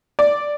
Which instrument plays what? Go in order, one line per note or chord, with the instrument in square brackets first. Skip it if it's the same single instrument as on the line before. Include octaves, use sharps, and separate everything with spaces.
[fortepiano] D5